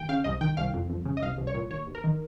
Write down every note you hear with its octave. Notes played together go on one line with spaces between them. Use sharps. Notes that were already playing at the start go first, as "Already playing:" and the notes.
Already playing: D#2 G5
C#3 F5
C2 D#5
D#3 G5
C2 F5
F2
F2
C#3
D#5
C2 F5
C2
C#5
A#2
D#2 C#5
D#2
A#4
D#3